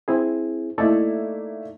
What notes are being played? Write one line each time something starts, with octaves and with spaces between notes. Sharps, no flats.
C4 E4 G#4
A3 A#3 D#4 E4 A4 D5